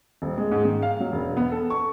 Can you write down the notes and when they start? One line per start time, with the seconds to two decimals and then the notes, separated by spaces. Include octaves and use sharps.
0.22 D#1
0.38 G#3
0.51 G#2
0.65 D#3
0.82 F5
1.00 F#3
1.12 E1
1.37 B3
1.52 A4
1.70 C#6